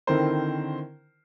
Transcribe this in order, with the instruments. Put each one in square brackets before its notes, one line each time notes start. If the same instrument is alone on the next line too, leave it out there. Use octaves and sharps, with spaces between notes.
[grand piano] D3 D#3 C4 E4 A#4 C5